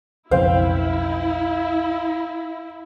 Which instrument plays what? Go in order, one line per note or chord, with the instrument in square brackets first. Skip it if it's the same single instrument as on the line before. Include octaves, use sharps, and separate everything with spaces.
[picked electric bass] B1 F2 C#3 [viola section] E4 [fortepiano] C5 [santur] F5 G5